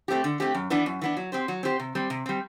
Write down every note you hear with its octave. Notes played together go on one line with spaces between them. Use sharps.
A3 C4 G4
D3
A3 C4 G4
F#2
E3 B3 D4
F#2
E3 B3 D4
F#3
C4 G4 C5
F#3
C4 G4 C5
C3
G3 C4
C3
G3 C4